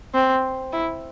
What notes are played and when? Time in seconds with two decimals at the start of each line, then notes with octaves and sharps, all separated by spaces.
0.14 C4
0.73 E4